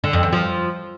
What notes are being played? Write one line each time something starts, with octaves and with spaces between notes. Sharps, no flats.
D3
F2
E2
F3